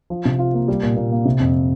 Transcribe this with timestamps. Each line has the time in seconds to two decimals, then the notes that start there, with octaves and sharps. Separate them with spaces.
0.10 F3
0.25 C3
0.39 F4
0.54 A#3
0.68 G3
0.83 A#2
0.96 A#2
1.12 A#3
1.25 C3
1.40 F2